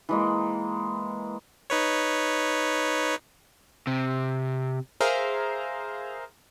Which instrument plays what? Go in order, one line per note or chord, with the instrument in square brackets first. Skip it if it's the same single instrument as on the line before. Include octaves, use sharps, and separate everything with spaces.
[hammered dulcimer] E3 G#3 A#3
[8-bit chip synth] D#4 B4 C#5
[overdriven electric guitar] C3
[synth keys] G#4 A#4 C5 E5 F5 A#5